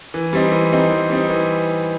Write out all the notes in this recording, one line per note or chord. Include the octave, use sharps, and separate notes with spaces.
E3
G3 C4 D#4
E3
G3 C4 D#4
E3
G3 C4 D#4
E3